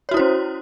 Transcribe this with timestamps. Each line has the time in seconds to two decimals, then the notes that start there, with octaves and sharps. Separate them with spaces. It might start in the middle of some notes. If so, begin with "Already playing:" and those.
0.09 C#5
0.11 F#4
0.14 E4
0.17 C5
0.19 C#4